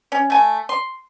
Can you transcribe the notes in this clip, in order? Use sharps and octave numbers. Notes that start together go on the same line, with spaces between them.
C#4
A3 G#5
C6